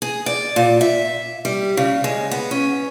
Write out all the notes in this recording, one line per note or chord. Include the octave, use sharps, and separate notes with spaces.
G#4
D5
A#2
E5
G3
C#3
G#3
B3
C#4